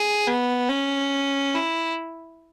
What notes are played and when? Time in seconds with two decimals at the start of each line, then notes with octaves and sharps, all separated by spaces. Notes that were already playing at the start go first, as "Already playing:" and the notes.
Already playing: G#4
0.27 B3
0.69 C#4
1.54 E4